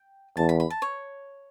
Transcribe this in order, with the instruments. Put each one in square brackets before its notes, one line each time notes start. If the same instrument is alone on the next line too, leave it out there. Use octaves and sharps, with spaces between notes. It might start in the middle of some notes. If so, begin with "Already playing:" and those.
Already playing: [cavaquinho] G5
[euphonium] E2 [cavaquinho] A5
[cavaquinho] B5
B5
A5
C#5